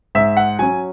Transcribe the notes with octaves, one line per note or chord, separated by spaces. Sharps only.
G#2 E5
F#5
F#3 C#4 G#5